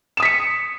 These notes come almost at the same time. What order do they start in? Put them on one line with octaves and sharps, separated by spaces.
E7 D#6 B6 C#7